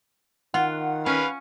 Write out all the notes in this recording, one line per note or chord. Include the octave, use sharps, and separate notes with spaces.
D#3 F4 F#5
C#4 B4 F5